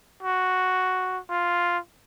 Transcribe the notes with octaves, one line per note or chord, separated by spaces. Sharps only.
F#4
F4